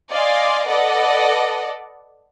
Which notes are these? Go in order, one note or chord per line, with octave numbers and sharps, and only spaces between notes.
D5 D#5 F5 G#5 C6
A4 B4 D5 D#5 F#5